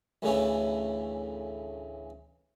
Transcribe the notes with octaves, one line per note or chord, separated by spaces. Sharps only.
A1 D2 C#3 E3 A3